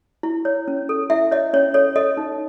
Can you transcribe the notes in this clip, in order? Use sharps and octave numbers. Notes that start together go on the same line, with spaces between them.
E4
C#5
C#4
A4
E4 E5
C#5 D#5
C#4 C#5
A4 C#5
A4 D#5
D#4